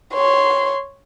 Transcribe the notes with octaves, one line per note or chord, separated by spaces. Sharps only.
C#5 C6